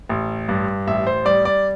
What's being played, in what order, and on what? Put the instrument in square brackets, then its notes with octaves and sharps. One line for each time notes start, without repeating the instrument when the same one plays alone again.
[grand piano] A1
G2
A1 E5
C5
G3 D5
D5